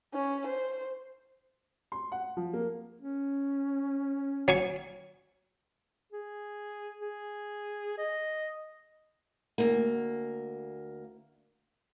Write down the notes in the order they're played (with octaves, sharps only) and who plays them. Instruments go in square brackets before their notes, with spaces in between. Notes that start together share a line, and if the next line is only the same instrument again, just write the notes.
[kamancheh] C#4
C5
[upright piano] C6
F#5
F3
A#3
[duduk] C#4
[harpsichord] F#3 G#5 C#6
[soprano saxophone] G#4
G#4
D#5
[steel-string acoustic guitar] D2 A#3